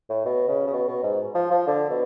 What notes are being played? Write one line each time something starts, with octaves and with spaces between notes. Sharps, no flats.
A2
B2
C#3
C#3
B2
B2
G#2
F3
F3
D3
B2